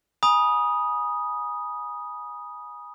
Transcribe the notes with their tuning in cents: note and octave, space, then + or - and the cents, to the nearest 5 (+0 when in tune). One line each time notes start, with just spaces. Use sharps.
G#5 +0 B5 -35 D#6 +0